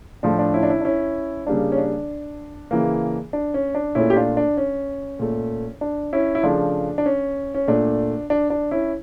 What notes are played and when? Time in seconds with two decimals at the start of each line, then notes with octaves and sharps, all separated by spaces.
0.23 A2 F3 A3 D4
0.39 D4
0.54 C#4 E4
0.63 D4
0.69 C#4 E4
0.81 D4
0.85 C#4 E4
1.47 C#3 G3 A#3 D4
1.72 C#4
1.78 D4
2.71 C#3 E3 A#3
3.33 D4
3.54 C#4
3.75 D4
3.95 A#2 A3 C#4 E4
4.10 G4
4.16 D4 F4
4.37 D4
4.57 C#4
5.19 A#2 A3
5.81 D4
6.13 C#4 E4
6.35 E4
6.43 C#3 F3 A3 D4
6.98 D4
7.06 C#4
7.55 C#4
7.68 A#2 A3 D4
8.30 D4
8.50 D4
8.71 C#4 E4